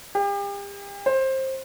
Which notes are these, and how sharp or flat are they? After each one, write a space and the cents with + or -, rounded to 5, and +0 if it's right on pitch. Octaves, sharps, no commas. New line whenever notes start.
G4 +40
C5 +20